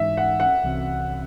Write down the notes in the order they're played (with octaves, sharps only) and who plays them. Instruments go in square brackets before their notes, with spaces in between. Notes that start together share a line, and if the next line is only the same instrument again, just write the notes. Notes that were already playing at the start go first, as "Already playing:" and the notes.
Already playing: [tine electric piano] G#2 E3 G#3 D#4 [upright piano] E5
[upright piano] F#5
F#5
[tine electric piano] C2 C3 E3 C4 F#4